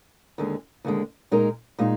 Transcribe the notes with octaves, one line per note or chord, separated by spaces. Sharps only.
D#2 D3 G#3
D#2 D3 G#3
A#2 G#3 D#4 A#4
A#2 G#3 D#4